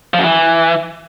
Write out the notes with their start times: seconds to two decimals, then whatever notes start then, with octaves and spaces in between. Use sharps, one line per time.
0.14 F3
0.19 F#2
0.24 E3